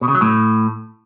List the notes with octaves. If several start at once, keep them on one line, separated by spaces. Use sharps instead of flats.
B2
C#3
F#3
A2